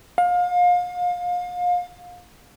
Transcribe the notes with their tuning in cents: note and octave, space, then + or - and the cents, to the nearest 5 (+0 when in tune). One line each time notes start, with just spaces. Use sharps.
F5 +30